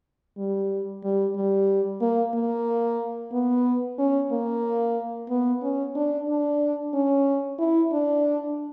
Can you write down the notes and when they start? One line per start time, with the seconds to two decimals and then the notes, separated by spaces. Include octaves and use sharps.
0.37 G3
1.04 G3
1.35 G3
2.01 A#3
2.34 A#3
3.33 B3
3.98 C#4
4.31 A#3
5.29 B3
5.62 C#4
5.95 D4
6.29 D4
6.94 C#4
7.59 E4
7.92 D4